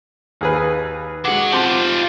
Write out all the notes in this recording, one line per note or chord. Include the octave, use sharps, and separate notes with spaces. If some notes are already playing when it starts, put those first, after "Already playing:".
D#2 G#4 B4
F#3 G#3 F#5 D6
C4 F4 G4 A5 C6